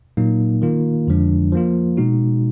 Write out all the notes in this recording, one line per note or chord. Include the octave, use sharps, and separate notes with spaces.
A#2 F#3 A#3 D#4
D#3 A#3 F4
F2 D3 F3 G#3 D4
F3 A#3 F4
B2 G#3 D#4 F#4